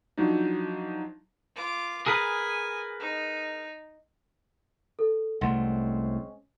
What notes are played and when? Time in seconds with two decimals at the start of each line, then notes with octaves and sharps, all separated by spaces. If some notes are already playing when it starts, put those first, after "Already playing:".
0.18 F3 F#3 D4 D#4
1.55 F4 D6
2.06 G#4 A#4 B4 G#5 D#6
3.00 D#4
4.99 A4
5.41 C2 G#3 A3 C4 C#4 F#5 C6